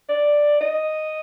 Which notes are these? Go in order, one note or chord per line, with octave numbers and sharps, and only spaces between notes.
D5
D#5